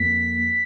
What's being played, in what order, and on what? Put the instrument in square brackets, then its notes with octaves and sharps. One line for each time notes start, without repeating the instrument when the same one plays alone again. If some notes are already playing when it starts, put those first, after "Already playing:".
Already playing: [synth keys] F2 A#3 B6